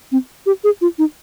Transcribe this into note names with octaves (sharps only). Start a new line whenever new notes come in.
C4
G4
G#4
F4
D#4